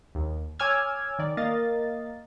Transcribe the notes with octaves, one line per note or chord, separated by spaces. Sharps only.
D#2
C#5 G#5 D6 E6 F6 G#6
D#3 D5
A#3 A#4 D#5 F5 A6